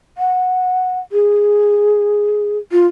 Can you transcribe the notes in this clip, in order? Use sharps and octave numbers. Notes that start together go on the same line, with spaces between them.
F#5
G#4
F4